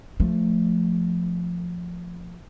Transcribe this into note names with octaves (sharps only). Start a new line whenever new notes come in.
F3 A3